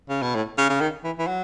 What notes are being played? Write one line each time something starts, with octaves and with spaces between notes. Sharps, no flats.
C#3
B2
A2
C#3
C#3
D#3
E3
E3
F#3